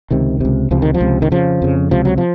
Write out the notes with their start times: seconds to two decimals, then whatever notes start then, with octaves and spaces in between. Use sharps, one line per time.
0.11 C#2 C3 D#3
0.40 C#2 C3
0.71 C#2 C3 F3
0.82 D#3
0.94 F3
1.01 C#2 C3
1.22 D#3
1.31 F2 C#3 F3
1.62 F2 C#3
1.91 C#2 C3 F3
2.05 F#3
2.18 F3